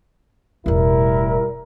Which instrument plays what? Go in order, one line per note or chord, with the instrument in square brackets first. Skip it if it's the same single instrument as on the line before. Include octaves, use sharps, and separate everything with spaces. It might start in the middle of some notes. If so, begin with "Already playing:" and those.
[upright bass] E1 A2 [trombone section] G3 E4 A#4